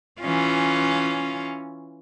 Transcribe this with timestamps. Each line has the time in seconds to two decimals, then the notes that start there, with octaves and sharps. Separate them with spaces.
0.21 E3 C#4 F4